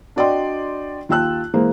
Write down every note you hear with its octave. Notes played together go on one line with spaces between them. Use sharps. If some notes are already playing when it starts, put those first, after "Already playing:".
D4 F#4 D5 D#5 G5 C6
D#2 F4 G5 A5 E6 F#6
E3 G#3 A#3 C5